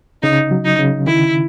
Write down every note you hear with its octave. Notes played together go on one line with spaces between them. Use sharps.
C#3 D#4
F#3
D#4
C#3
D#3 E4